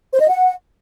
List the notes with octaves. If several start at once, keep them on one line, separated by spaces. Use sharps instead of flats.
C5
D#5
F#5